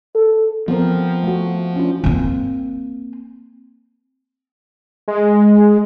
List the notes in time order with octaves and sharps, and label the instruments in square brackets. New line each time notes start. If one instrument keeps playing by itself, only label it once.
[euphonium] A4
[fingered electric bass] F3 [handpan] B3 C4 A#4
[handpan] A3 F#4
C#4 D4 F4
[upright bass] A#3 C4
[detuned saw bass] G#3